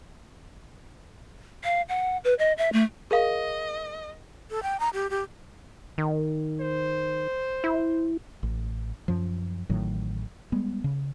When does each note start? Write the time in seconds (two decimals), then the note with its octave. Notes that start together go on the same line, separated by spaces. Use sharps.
1.64 F5
1.89 F#5
2.25 B4
2.39 D#5
2.58 E5
2.73 A3
3.11 G#4 A#4 D#5 F5
4.51 A4
4.63 G5
4.80 A#5
4.93 G4
5.10 G4
5.98 D#3
6.61 C5
7.64 E4
8.43 A1
9.08 F#2 F3
9.69 A1 A2 D#3 F#3
10.52 G3 G#3 B3
10.84 C#3